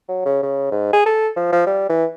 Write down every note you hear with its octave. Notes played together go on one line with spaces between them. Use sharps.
F#3
C#3
C#3
G#2
G#4
A4
F3
F3
G3
E3